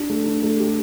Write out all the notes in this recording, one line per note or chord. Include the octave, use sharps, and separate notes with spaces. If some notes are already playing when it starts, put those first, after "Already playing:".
Already playing: D4 G4
A3
D4
A3
G4